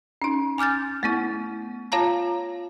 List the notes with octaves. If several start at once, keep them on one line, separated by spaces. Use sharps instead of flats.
C#4 D#4
G#5 D6 F6 G6 A6
A3 B3 E4
F4 C#5 F5 A5 A#5